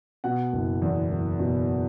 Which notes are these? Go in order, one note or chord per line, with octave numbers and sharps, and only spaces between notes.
B2 F#5
F#1
E2
F#1
B2